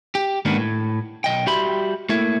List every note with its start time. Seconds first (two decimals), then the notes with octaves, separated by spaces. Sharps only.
0.15 G4
0.45 G#2 D#3 A#3 B3 D4
0.58 A2
1.24 B1 D#5 G5
1.46 G3 F#4 G4 E5 B5 C6
2.09 A3 A#3 E4